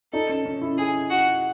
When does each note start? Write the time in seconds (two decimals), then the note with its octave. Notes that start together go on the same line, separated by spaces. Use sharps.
0.13 D#4 A4
0.29 C#4
0.45 C#4
0.61 E4
0.78 G#4
1.10 F#4